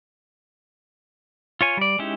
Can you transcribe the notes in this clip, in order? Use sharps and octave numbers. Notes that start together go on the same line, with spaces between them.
F4 C#5 G#5
G3 D5
G#3 C#4 D#4 E4 G4